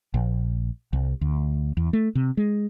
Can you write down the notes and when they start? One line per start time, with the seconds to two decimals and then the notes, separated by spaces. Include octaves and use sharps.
0.14 A#1
0.93 C2
1.21 D2
1.77 E2
1.93 A3
2.15 C3
2.37 G#3